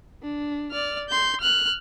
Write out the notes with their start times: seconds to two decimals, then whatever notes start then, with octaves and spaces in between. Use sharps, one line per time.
0.22 D4
0.71 D5 F6
1.09 C6 G6
1.41 F6 F#6